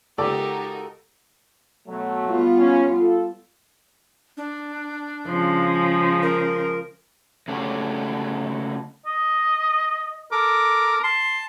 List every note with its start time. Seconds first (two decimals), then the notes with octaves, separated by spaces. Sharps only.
0.18 C#2 D#4 F#4 G4 A4 A#4 D5
1.88 B2 F#3 A3
2.26 G3 B3 F4
2.59 C#4
2.98 F4 A4
4.37 D4
5.27 C#3 F3 G#3
6.23 A#4
7.48 C#3 F#3 A3 D4 G4 C#5
9.06 D#5
10.32 A4 A#4 D6
11.03 A5 C6